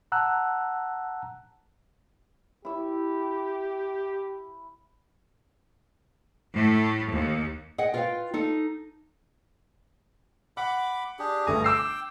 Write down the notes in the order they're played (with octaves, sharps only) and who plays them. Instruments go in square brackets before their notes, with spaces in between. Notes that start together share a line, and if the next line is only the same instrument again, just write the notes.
[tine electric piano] F#5 A5 A#5 E6 F#6
[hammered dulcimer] E4 E5 [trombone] G4
[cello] A2 A3
D#2
[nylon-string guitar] G#4 D#5 F#5 G5
F4 A#4 B4 D#5 F5 G5
D#4 A4
[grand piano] F#5 [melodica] B5 D6
[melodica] D4 G4 G#4
[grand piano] G1 A3 G#5 [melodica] G#4 A#5
[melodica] G5 [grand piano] D6 E6 C7